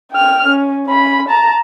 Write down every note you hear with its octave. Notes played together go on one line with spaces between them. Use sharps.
G5 F6
C#4
C#4 B5
A5 A#5